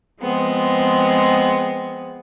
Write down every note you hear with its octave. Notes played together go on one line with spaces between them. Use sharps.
F3 G#3 B3 C4